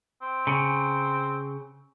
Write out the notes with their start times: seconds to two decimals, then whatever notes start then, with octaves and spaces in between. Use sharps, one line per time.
0.22 C4
0.47 C#3